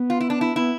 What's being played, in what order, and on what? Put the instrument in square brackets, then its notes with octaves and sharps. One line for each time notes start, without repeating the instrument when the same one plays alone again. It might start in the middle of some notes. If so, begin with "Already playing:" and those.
Already playing: [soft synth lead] B3
[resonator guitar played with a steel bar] F4
E4
D4
E4
[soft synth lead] B3 [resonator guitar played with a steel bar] E4